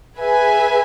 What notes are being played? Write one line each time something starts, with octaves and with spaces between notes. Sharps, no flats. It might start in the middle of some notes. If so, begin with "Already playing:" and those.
G#4 B4 E5 G#5